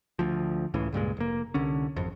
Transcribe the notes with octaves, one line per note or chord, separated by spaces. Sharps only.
D2 F3
C#2 A2 C#3 E3
C#2 G2 A#2 G#3
F1 A#3
C2 D3 C#4
G#1 F2